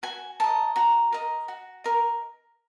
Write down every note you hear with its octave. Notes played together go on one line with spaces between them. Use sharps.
F#4 G#5
A#4 D#5 A5
F#4 A#5
A#4 D#5
F#4
A#4 D#5